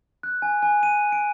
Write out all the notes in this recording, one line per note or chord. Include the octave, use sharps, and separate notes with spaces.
F#6
G#5
G#5
D#7
D7